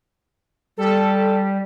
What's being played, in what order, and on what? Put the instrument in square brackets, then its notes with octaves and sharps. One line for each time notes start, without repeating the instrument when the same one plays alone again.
[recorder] G3 [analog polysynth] A4